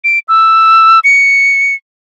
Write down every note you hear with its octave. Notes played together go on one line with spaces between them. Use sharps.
D7
E6
C#7